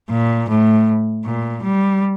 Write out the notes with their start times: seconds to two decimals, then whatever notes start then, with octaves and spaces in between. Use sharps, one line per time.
0.11 A#2
0.49 A2
1.25 A#2
1.63 G3